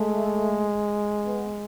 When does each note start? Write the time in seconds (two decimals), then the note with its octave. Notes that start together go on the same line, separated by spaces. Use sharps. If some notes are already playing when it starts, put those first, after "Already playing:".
Already playing: G#3 A3
1.25 B3